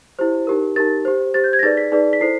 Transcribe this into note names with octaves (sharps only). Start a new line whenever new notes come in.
E4 G4 C5
D#4 G4 A#4
D#4 G4 A#4 A6
G4 C5
G4 C5 A6
G6
G#6
A#6
D#4 G#4 B4 D5 A6
B6
D#4 G#4 B4 D5
B6
E4 A4 C5 C7